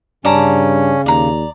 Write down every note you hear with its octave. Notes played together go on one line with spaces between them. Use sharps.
G2 C#3 C#4 D5 A5 A#5
D#2 D5 A#5